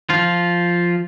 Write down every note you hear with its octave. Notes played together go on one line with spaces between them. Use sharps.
F3 F4